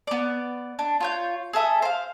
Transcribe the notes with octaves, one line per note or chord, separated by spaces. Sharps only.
B3 D5
D4
F4 C#5 G6
G#4 A4 E5 D#6
C5 F5